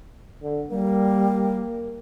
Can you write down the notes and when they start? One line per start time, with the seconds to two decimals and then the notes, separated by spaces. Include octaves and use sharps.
0.42 D3
0.71 G3 A#3